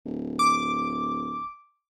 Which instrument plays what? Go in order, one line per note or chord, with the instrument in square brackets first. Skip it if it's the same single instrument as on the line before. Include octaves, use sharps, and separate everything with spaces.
[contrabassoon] D1
[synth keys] D6